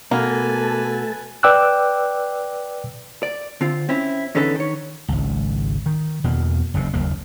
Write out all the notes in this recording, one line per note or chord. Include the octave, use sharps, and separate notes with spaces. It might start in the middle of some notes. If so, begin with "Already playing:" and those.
B2 A3 A#3 A4 B4 G#5 A5
B4 D5 G5 D6 E6 F#6
D5
D3 C4 F4
C4 C#4 E4
E2 D3 C#4 D#4 A4 B4
D#3 C#5
G#1 C#2
D#3
E2 B2 E3 A#3
F#1 D#2 C3
F#1 D#2 A#3